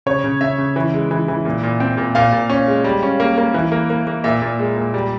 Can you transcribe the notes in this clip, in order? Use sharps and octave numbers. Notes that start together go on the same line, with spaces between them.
C#3 C#5
C#3
C#3 E5
C#3
E3
G#3
E3
E3
A#2
A#2
C4
A#2
A#2 F5
A#2
C#4
G#3
G3
C#4
A#3
A#3
E3
A#3
A#3
A#3
A#2 E5
A#2
G#3
A#2
G3